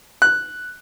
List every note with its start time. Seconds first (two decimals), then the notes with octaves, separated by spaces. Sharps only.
0.22 F#6